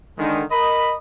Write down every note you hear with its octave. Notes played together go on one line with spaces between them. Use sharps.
D3 D#3 G#3
A#4 D#5 B5